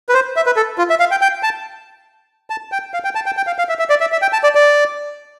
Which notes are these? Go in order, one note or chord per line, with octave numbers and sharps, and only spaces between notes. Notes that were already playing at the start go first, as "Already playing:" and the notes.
B4
C5
E5
B4
A4
F4
E5
F5
G5
G5
A5
A5
G5
F5
G5
A5
G5
G5
F5
F5
E5
E5
D5
E5
E5
G5
A5
D5
D5